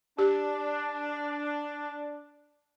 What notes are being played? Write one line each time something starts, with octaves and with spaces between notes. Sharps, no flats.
D4 G4